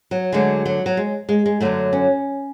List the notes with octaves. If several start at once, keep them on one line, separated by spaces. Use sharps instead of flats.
F#3
D2 D3 F#3 G#3
F#3
F#3
G#3
G#3
G#3
F#2 D3 F#3 A3
C#4